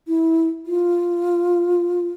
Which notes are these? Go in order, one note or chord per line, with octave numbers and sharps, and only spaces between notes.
E4
F4